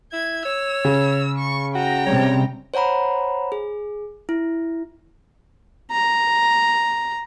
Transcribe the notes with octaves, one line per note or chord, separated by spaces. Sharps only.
E4 G#6
C#5 E6
C#3
C#6
F#4 G5 A#5
C3 G3 C#5
C5 C#5 F#5 A#5 B5
G#4
E4
A#5